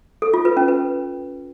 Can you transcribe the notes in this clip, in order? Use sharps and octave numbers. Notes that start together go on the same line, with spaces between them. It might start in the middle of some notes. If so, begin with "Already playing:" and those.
A4
F4
B4
C#4
B4